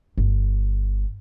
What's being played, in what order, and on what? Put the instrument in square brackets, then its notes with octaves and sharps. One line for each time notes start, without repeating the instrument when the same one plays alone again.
[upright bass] G1